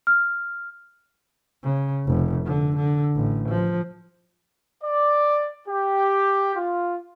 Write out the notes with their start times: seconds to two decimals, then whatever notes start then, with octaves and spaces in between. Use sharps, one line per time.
0.07 F6
1.63 C#3
2.06 F1
2.46 D3
2.76 D3
3.15 A1
3.49 F3
4.84 D5
5.67 G4
6.55 F4